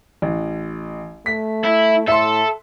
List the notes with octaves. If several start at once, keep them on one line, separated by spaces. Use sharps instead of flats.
A1
A3 B6
E4
A2 A4 E5 C6